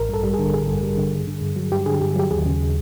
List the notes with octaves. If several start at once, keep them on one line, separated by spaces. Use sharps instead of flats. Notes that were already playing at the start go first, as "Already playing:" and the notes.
Already playing: A1 A#4
G2 A4
G3
G#4
D3
A1 G#4
G2
G3
D3
G2
D3
G2
F#3
G2 G4
D3 G#4
G2 G4
F#3 G4
D#2 G#4
C#3